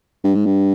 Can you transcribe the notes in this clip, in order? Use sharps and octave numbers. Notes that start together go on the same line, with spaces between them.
G2
G#2
G2